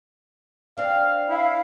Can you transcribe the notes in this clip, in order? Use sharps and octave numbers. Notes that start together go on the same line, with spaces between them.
C4 D4 F5
E4 F5